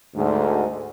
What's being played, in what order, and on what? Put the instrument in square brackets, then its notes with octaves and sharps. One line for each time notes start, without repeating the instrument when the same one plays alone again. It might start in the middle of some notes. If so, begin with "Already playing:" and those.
[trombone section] D2 G#2